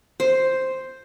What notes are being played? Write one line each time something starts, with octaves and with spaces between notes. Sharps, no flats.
C5